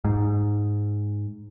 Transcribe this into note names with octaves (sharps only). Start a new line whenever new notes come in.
G#2